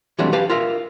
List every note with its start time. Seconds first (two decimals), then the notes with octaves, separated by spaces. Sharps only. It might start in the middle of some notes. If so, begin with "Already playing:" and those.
0.19 E3 F#3 G3 A3 C4 D4
0.33 G4 B4 F5 A5
0.50 F4 A#4 E5 F5